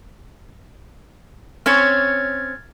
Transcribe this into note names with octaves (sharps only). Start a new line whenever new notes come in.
C4 C#4 C#5 F6 G#6 A6